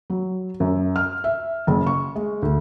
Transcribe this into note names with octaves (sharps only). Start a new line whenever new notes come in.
F#3
F#2
F6
E5
F#1
C#6
G#3
D2